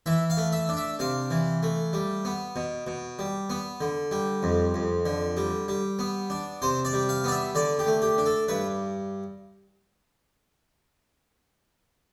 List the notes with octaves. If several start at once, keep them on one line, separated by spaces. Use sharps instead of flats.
E3 E5
F5
A3
E5
D4
E5
C3 F5
E3
A3
G3
B3
B2
B2
G3
B3
D3
G3
F2
F2
D3
G3
G3
B3
D4
C3 C5
D5
G3
F5
B3 D5
E5
D3 D5
G4
A3
G4
D4
A4
G2 B4